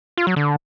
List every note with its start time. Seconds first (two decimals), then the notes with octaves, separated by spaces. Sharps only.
0.17 F4
0.27 F#3
0.36 D3